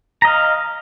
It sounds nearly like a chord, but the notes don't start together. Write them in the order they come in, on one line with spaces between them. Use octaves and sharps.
A#5 D#5 F5